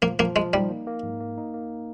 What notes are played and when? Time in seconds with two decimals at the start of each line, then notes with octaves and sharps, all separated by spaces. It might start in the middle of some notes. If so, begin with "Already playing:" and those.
0.02 F3 A#3
0.19 F3 A#3
0.36 F3 G#3
0.53 G3 D#4
0.70 A#3
0.87 A#3
1.03 G#2
1.20 A#3
1.38 D#4
1.54 A#3